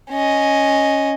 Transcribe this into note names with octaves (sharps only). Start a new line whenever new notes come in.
C#4 D#5